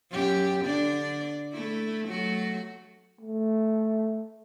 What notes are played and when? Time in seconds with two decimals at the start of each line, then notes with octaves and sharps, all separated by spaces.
0.11 F#2 G4
0.64 D3 D4 D5
1.53 A3 E4
2.08 F#3 A3 F#4
3.21 A3